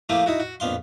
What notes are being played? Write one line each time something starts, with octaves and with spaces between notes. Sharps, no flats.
F3 A3 A#3 E4 F4 G4
D#4 E4 F#4
F#4
A#1 F2 B3 F5 C6